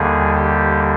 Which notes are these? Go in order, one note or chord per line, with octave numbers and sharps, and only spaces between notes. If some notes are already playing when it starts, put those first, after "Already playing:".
Already playing: D#2 D3 G3 G#4
G4